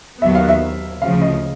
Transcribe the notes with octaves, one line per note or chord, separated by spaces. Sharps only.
D#2 D#3 F#3 B3 E5
F5
E5
D2 C#3 F3 F5
D#5